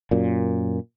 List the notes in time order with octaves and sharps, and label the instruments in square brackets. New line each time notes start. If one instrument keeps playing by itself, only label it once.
[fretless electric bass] F#2 A#2